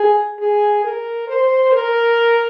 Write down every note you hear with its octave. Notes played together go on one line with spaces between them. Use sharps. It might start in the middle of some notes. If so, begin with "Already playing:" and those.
Already playing: G#4
G#4
A#4
C5
A#4